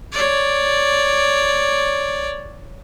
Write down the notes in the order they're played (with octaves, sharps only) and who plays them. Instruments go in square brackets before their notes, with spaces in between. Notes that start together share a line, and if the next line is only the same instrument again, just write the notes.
[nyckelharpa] C#5 D5